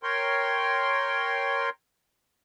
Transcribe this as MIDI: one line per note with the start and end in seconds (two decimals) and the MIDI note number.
0.03 1.70 70
0.03 1.70 73
0.03 1.70 79
0.03 1.70 84